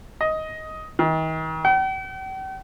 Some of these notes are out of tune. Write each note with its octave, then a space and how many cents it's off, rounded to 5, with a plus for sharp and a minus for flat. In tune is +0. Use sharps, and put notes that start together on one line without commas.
D#5 +10
D#3 +40
G5 -45